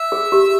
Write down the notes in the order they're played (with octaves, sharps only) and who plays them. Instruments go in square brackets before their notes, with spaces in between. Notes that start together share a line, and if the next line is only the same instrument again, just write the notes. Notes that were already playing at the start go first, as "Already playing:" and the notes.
Already playing: [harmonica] E5
[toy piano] G#4
G4